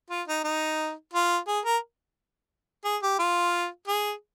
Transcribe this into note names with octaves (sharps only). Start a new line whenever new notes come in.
F4
D#4
D#4
F4
G#4
A#4
G#4
G4
F4
G#4